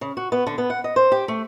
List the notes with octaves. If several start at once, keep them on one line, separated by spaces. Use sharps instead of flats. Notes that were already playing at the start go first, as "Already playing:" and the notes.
C#3
F#4
B3
D3
B3
F#5
D#5
C5
G4
A3